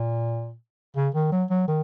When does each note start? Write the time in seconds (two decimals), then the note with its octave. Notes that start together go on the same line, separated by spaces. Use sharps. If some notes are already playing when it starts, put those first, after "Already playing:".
Already playing: A#2
0.96 C#3
1.15 D#3
1.32 F#3
1.50 F#3
1.68 D#3